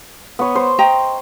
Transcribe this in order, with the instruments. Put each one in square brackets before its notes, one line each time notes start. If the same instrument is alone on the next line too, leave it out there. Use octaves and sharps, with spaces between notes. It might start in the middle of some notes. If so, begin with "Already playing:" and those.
[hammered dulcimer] B3 C#5
C5
[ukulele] D#5 G5 A#5